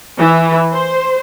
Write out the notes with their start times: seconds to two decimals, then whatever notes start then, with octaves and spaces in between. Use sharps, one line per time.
0.18 E3
0.71 C5